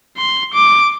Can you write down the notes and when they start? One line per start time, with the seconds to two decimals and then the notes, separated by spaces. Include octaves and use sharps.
0.17 C6
0.54 D6